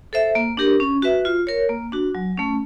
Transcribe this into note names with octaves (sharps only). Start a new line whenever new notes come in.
A4 C5 E5
A#3
D4 G4 A#4
C#4
F#4 B4 E5
F4
A#4 C#5
A#3
D4 F#4
F#3
A3 C#4